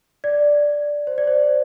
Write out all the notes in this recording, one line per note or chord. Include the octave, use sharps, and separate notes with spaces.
D5
C5
D5
C5